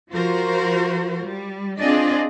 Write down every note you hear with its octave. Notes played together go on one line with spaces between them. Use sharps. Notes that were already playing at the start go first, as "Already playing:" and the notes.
F3 F4 F#4 A#4 C5
G3
C4 D4 F4 G#4 D5 D#5